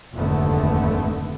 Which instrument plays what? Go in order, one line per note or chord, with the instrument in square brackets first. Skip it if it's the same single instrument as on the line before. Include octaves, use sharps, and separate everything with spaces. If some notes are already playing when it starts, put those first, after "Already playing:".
[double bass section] F1 D#2 G#2 D3 A3 B3